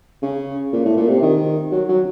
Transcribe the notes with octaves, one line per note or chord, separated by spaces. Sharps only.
C#3
A#2
A2
A#2
C3
D#3
F#3
F#3